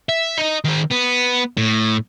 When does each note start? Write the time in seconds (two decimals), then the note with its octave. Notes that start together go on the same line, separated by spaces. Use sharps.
0.09 E5
0.38 D#4 D#5
0.65 D#3 C4
0.91 B3
1.57 A2